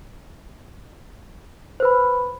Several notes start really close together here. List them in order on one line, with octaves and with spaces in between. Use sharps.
C5 B4 B5